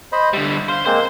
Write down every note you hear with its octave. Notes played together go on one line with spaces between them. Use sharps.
C5 D#5 B5
D3 G3 E5
C5 F5
G#3 A#3 C4 C5